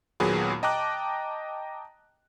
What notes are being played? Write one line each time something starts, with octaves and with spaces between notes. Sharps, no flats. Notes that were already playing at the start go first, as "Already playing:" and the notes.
D#2 A#2 F#3 B3 G#4 B5
D#5 G5 A5 A#5 D6 F#6